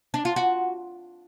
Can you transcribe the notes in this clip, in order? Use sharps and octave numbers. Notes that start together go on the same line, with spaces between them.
D4
F4
F#4